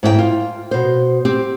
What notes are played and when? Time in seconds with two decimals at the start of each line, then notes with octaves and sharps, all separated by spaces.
0.03 G#2 E4 A#4 G5
0.19 F4
0.71 B2 C5
1.25 C4 G4